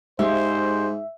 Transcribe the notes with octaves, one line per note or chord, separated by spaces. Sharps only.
G#2 G#3 G4 C5 E5 F5